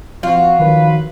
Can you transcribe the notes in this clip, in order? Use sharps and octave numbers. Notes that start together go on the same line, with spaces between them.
F3 C4 F4 F#4
D#3 F3 F#3 B4